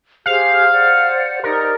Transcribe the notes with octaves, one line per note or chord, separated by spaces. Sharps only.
G4 G#4 C5 F5
C5 D5 F#5
D#4 G4 A#4 D5